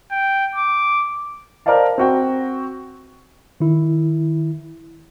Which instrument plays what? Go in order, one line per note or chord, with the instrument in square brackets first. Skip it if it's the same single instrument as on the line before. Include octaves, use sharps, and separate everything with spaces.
[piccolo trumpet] G5
D6
[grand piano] A#4 C5 D5 D#5 F5 A5
C4 F#4 G5
[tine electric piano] D#3 E4